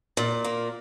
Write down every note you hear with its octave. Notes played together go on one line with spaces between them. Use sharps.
A#2
A#3